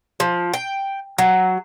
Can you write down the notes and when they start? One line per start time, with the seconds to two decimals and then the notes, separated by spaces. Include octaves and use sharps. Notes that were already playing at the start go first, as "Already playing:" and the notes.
0.20 F3
0.54 G5
1.18 F#3